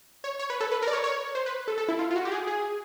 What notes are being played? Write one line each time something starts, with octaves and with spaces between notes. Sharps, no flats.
C#5
C#5
B4
A4
B4
A#4
D5
C#5
C#5
C5
B4
A4
A4
E4
F4
F4
F#4
G4
G#4
G#4